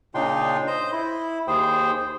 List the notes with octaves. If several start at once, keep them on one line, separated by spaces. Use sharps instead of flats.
A#2 C#3 D4 D#4 G5 C6
C5 D#5 G6
E4
D#2 G#4 C5 G5